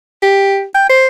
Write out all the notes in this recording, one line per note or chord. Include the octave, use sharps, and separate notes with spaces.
G4
G5
C5